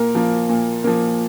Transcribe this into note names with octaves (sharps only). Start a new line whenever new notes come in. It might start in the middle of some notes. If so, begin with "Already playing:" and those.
Already playing: A#2 A#3 A#4
F3 A#3
A#2
F3 A#3